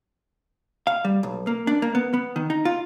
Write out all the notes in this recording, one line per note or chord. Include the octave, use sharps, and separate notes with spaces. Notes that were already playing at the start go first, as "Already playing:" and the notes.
F5
G3
B1
A#3
D4
A#3
B3
B3
D#3
D#4
F4